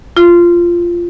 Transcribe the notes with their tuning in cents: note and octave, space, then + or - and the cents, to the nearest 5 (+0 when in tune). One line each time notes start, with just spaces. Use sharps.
F4 -10